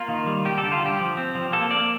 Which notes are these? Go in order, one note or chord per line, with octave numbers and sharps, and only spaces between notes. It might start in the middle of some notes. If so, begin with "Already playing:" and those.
Already playing: A#3 F4
D#3
G3
G3 G4
A4
D3
F4
G3
G4
F3
C4
F3
A#3 A4
A#3 D5